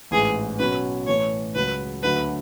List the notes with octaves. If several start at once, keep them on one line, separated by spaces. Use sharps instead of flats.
A1 G#2 E3 G#4
B2 F#3 C#4 B4
A2 E3 A3 C#5
C#2 C#3 F#3 B4
D2 D3 F#3 B4